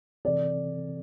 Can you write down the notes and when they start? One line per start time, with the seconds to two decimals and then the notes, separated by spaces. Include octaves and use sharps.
0.25 C3 E3 C4 A4 D5